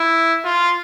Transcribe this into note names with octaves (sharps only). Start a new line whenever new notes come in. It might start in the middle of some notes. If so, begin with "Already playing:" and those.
Already playing: E4
F4